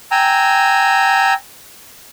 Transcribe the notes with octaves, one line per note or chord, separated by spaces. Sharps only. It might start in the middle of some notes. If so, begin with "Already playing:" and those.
G5 G#5 A#5 E6